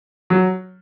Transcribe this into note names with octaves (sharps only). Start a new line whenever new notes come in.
F#3